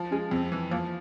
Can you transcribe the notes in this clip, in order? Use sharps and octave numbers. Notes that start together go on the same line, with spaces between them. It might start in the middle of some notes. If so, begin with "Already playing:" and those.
Already playing: F3
G#3 C#4
F2 C4
E3
F3 A#3